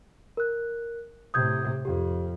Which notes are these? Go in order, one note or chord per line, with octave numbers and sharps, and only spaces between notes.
A#4 F#6
A2 C3 D#6 G6 G#6
F2 G4